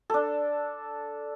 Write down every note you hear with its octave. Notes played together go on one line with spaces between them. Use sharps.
D4 A4